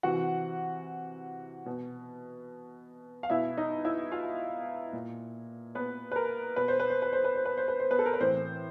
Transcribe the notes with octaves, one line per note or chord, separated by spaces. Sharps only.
C3 E3 F#4 F#5
B2
F5
B2 E4 E5
D#4 D#5
E4 E5
F4 F5
A#2
B3 B4
B4
A#4
B2 B4
C5
B4
C5
B4
C5
B4
C5
B4
C5
B4
C5
B3 B4
A4
A#4
B4
A2 E3 C4 C5